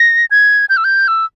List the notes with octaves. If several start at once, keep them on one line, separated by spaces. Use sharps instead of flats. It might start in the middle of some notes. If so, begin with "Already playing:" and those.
Already playing: A#6
G#6
G6
E6
G6
E6